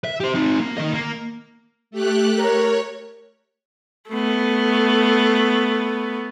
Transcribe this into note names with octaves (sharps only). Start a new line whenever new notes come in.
E5
G4 C5
C4 D#4
A#3
D#3 D#5
A#3
A3 G4 F#6
A#4 C#5
A3 B3